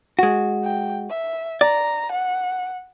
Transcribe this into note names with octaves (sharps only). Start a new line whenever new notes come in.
G#3 F#4
G5
E5
D5 A#5
F#5